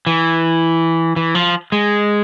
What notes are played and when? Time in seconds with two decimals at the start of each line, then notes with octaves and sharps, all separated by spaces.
0.07 E3
1.16 E3
1.35 F3
1.72 G#3